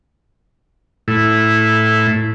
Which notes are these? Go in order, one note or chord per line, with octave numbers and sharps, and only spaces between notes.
A2 E4